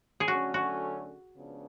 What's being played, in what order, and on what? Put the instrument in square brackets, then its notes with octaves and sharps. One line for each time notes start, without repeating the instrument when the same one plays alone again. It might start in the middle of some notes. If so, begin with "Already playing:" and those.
[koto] G#4
[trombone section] D3 F#3 A3 C#4 [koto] F#4
[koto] F#4
[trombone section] C#2 C#3 F3 B3 D4